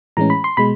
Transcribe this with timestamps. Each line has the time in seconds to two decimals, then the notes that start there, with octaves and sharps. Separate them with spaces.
0.17 A2 E3 G#3 C#4 A#5
0.30 B5
0.44 C6
0.57 B2 G#3 B5